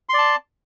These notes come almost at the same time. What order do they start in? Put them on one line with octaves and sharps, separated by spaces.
C6 D5 A5